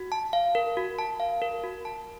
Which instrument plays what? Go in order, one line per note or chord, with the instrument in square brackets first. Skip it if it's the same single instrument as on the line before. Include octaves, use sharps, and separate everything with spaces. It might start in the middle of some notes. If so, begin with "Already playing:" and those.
Already playing: [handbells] F#4
A5
F5
A#4
F#4
A5
F5
A#4
F#4
A5